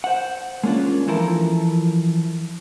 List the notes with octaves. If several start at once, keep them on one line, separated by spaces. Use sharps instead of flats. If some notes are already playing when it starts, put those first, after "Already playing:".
C5 F#5
G#3 A#3 C#4 D4 F4
E3 F3 E4 A4 A#4